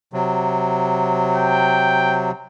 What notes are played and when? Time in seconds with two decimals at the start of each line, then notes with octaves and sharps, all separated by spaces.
0.13 C3 F#3
1.36 G5